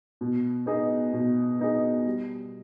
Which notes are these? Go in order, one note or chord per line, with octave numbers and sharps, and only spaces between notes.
B2
B3 D#4 G#4
B2
B3 D#4 G#4
G3